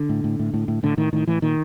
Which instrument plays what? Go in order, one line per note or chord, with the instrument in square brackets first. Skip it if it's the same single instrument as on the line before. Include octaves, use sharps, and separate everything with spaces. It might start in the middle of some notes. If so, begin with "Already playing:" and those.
Already playing: [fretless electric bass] D3
A2
A2
A2
A2
A2
A2 D3
A2 D#3
A2 D#3
A2 E3
A#2 D#3